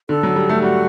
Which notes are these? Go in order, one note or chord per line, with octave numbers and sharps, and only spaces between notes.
D3 A4
F#3
G3
A3
G3 F#4